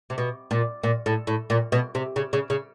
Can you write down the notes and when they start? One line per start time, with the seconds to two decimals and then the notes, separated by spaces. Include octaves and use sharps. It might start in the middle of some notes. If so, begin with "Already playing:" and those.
0.10 C3
0.18 B2
0.51 A#2
0.83 A#2
1.06 A2
1.27 A2
1.50 A#2
1.72 B2
1.95 C3
2.16 C#3
2.33 C#3
2.50 C#3